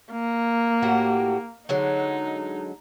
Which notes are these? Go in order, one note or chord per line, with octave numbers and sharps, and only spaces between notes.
A#3
A2 F#4 G4
D3 F#3 G#3 D#4